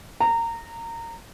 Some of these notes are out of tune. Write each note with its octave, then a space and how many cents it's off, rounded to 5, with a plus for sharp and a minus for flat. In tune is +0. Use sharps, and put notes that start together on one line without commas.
A#5 -20